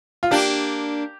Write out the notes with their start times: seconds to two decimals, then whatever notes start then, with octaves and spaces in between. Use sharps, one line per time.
0.23 F4
0.31 A#3 D4 G4